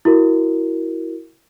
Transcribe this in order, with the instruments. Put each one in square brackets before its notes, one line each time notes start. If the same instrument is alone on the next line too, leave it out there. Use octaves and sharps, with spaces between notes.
[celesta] E4 F#4 A#4